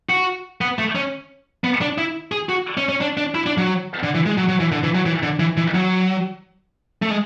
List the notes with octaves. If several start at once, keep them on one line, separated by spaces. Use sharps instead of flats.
F#4
B3
A3
C#4
B3
D4
E4
G#4
F#4
C#4
C#4
D4
D4
E4
D4
F#3
D3
E3
G#3
F#3
F#3
E3
D3
E3
F#3
E3
D3
E3
E3
F#3
A3
G#3